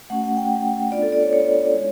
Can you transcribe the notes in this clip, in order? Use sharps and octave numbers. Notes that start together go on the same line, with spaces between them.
A3 C#4 F#4 F#5
F#5
G5
B3 D4 F4 D5
A4
D5
C#5
C#5
G#3 C#4 E4